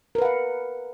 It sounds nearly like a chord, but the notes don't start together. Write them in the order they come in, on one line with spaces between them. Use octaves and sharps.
A#4 B4 F#5 F5